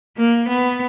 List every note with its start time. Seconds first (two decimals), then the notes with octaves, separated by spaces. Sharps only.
0.17 A#3
0.49 B3